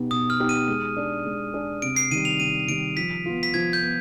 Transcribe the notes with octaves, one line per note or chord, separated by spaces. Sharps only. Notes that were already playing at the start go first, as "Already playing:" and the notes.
Already playing: B2 B3 D#4 G4
B2 D#6
F6
B3 D#4 G4
D#7
G#3
D4 G#4
G#3
D4 G#4
C3 D7
C7
D#3 G3 D#7
F7
C3 D#7
D#3 G3 D7
F3 B6
B3 F4
B6
F3 G#6
G6
B3